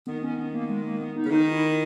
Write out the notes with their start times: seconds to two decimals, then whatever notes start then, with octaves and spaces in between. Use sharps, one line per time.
0.07 D#3 B3
0.23 C#4
0.38 B3
0.53 A#3
0.69 G#3
0.85 A#3
1.00 B3
1.16 D#4
1.25 C#3
1.31 D#3 D#4
1.51 E4